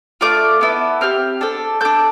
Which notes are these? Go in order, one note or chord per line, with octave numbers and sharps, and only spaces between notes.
A3 D4 F4 D6
B3 E4 A4
C4 G4 F6
D4 A4
D4 A4 G6